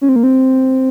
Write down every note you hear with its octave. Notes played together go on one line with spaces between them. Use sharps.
C#4
C4
A#3
C4